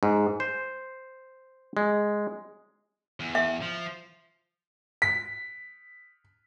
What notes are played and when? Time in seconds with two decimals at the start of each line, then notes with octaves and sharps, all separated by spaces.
0.03 G#2
0.40 C5
1.77 G#3
3.20 E2
3.35 E5
3.62 F3
5.02 B6